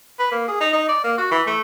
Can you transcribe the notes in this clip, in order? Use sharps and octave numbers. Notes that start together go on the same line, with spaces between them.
B4
A#3
G#4
D#4
D#4
D5
A#3
F#4
E3
A3